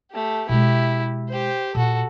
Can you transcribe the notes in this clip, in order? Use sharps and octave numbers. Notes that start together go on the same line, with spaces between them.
A3 G4
B2 G#3 E4 G4
G4 C5
A#2 F#4 A4